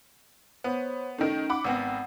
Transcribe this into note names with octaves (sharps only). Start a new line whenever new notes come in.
B3 C5 C#5
D#3 A3 C#4 D#4 D7
F#5 B5 D6
G#1 B3 C4 F#5 E6